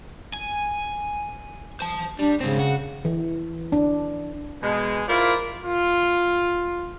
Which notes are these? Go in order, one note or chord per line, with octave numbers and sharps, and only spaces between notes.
G#5
C5 A5
G3 D4
G#2 C#3 C4
F#4
E3
D4
B2 G#3
E4 F4 A#4 C5 D5
F4